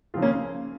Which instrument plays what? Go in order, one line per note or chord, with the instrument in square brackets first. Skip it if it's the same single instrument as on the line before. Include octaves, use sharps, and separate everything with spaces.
[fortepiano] C#3 F3 C4 F4 G#4
[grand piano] A#3 C#4